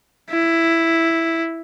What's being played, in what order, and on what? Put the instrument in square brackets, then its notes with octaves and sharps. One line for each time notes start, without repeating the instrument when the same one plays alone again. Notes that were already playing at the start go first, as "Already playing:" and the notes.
[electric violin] E4